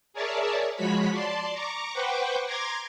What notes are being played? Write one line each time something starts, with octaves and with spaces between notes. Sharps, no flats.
G#4 A#4 C#5 D5 E5 A5
F3 G#3 F#4 C#5 B5 B6
D5 A5 C6
A#5 C#6 D6
B4 C5 F#5 G5 C#6 D6
A#5 C6 D6 G#6 A#6